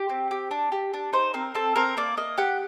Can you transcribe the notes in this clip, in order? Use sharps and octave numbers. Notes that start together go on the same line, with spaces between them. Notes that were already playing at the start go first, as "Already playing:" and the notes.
Already playing: G4
C4
G4
D4
G4
D4
D#4 C5
C4 A#4
C4 A4
C4 A#4
A#3 D5
A#3 D#5
G4 F#5